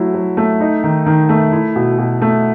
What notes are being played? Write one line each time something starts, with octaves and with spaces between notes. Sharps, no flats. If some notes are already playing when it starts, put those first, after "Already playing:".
Already playing: F#3 A3 E4
F#3
A3
D#4
D#3
D#3
A3
E4
B2
B2
A3